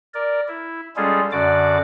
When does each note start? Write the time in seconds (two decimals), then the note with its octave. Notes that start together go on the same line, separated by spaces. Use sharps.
0.14 A#4 D5
0.48 E4
0.96 G3 G#3 C#4 F4 G#4 A4
1.32 F#2 D3 F#4 D5 D6